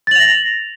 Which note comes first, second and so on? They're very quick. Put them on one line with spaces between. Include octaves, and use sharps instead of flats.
A6 F#7 F7 A#6